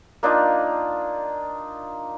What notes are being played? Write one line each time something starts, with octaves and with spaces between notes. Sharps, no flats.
A#3 D4 D#4 F4